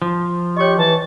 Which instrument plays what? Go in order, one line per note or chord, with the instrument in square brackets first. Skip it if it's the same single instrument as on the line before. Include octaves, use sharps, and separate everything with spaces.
[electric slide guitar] F3
[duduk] G4 [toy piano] C#5 D#5 [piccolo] C#6
[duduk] E3 [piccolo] A5